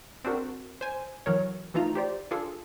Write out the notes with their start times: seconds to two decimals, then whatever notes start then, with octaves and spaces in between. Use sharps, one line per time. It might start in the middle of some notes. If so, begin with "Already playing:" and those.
0.24 C4 D4 F#4 A#4
0.81 C5 G#5
1.26 E3 F#3 A#4 C#5
1.74 E3 A3 D#4 F4 A#5
1.95 G4 C5 D5
2.31 D4 F4 G#4 A4